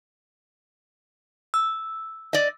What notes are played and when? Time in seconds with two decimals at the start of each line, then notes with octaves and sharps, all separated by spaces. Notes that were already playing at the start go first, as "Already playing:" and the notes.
1.54 E6
2.33 D5 D#5